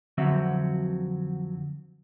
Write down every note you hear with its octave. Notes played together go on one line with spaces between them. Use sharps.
F2 D3 F#3 C4 F#4 E5